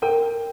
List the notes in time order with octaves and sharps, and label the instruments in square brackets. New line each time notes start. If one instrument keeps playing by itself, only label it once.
[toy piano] A#4 [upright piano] G5